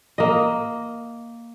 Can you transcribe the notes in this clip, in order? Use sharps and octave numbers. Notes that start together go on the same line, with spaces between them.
A#3 D#5